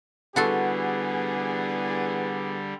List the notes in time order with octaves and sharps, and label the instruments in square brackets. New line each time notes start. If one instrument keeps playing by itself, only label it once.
[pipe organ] D3 G3 [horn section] E3 B3 G#4 [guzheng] F#4 A4 C6